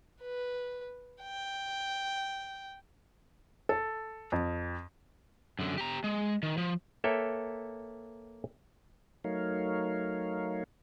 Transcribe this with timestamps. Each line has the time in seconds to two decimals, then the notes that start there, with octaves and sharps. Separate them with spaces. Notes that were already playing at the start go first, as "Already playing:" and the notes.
0.21 B4
1.22 G5
3.69 A4
4.32 F2
5.59 F#2 D3
5.78 G4 A#5
6.04 G#3
6.43 D#3
6.57 F3
7.04 A#3 A4 B4 C#5 E5 G5
9.24 F#3 A3 D#4 A#4 C#5 F5